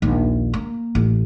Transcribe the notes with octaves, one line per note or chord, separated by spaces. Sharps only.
A#1 D#2
A#3
A1